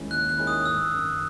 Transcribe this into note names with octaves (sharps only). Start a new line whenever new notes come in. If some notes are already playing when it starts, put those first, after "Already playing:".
Already playing: D#2 D#3 G#3 C#4 E4
D#2 F#6
F#6
D#3 G#3 C#4 E4
D#6
G#1 E6
F#2 D#3